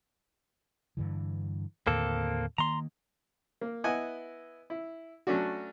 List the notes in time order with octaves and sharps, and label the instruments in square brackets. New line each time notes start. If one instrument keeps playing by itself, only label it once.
[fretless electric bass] G2 D3 E3
[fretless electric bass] D#2 A2 D3 [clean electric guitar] A#3 C4 A4
[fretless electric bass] D#3 A#3 [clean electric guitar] A#5 C6
[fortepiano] A#3
B3 E4 D#5 F#5 G#5
E4
F#3 A3 C#4 D4 F#4